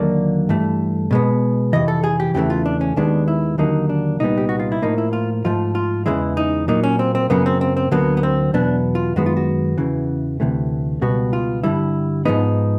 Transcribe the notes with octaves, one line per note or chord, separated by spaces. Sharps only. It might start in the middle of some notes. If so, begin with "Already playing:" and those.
Already playing: D#2 D3 F#3 A#3 D5
G2 E3 A3
B2 G#3 B3
F2 C3 E3 D#5
A4
G#4
G4
E2 C#3 E3 A3 G4
F4
D4
C#4
D#2 D#3 G#3 B3 D4
E4
D#2 D3 F#3 A#3 D#4
D4
C2 A#2 G3 B3 D#4
G4
F#4
F4
E4
A2 F3 A#3 D#4
E4
F4
G#2 F3 A3 F4
F4
E2 C#3 E3 G#3 E4
D#4
A#2 F#3 A#3 D#4
C#4
C4
C4
F#2 C#3 F#3 A#3 B3
C4
C4
C4
D2 D3 F#3 A#3 B3
B3
C4
E2 B2 F#3 B3 D4
F4
F#2 D#3 G#3 B3 F#4
F4
F#4
E2 C#3 E3
D2 C3 E3 A3
C#2 B2 G3 B3 F#4
F4
G2 D3 G3 E4
G#2 F3 G#3 B3 D#4